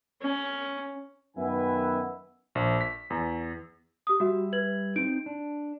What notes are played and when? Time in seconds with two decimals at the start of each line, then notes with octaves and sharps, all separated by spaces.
0.22 C#4
1.36 F#2 D#3 B3 B4 E5 G#5
2.55 A#1
2.81 B6
3.10 E2
4.07 G4 D#6
4.20 G3 F#4 E5
4.53 B4 G#6 F#7
4.96 C4 D#4 D7
5.26 D4